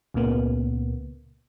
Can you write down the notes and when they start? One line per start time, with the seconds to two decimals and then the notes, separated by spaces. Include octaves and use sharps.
0.14 C#2 A#2 C#3 A#3 B3